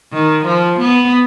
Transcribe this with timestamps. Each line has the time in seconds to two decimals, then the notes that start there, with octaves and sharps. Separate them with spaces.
0.13 D#3
0.46 F3
0.80 B3